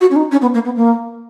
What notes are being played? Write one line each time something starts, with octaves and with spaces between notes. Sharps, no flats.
F#4
C#4
D#4
C#4
B3
A#3
B3
A#3